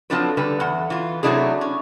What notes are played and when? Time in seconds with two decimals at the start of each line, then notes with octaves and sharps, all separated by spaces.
0.10 F3 F#3 C4 D4 A4 B4
0.37 D3 G3 B4
0.60 E2 F#5
0.90 E3 F4
1.23 C3 F#3 A3 D4 E4 G#4
1.61 C#4